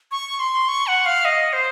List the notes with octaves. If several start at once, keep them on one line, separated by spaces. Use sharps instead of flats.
C#6
C6
C#6
F#5
F5
D#5
C5